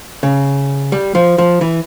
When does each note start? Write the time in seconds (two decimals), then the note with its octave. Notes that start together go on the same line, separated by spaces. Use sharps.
0.23 C#3
0.92 G3
1.15 F3
1.38 F3
1.61 E3